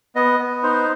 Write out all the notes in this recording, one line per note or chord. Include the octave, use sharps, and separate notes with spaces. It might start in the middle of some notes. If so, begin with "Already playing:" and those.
B3 D#5
B3
D#4 C5